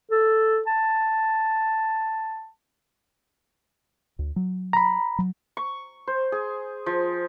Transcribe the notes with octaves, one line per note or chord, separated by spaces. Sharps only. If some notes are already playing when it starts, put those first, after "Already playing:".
A4
A5
D2
F#3
A#5 B5
F#3
C#6
C5
G#4
F3